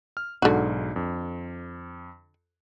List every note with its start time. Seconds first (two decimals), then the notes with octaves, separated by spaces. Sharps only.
0.17 F6
0.42 B1 G#2 D3 F#4
0.96 F2